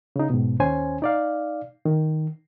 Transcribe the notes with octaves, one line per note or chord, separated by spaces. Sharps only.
C#3 D#4
G#2 B2
D#2 C#4 C5 G#5
D#4 D5 F5
D#3